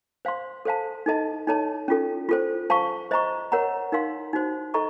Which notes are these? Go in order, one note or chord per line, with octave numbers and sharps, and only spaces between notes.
C5 F5 C6
A4 C5 F5 A5
D#4 A4 D#5 A5
D#4 A4 C#5 A5
C#4 F4 A4
F4 A4 C5
C5 F5 A5 C#6
C5 D#5 A#5 C#6
A#4 C#5 F#5 A#5
D#4 A#4 F5 C6
D#4 F#4 C5
A4 D#5 A#5 C#6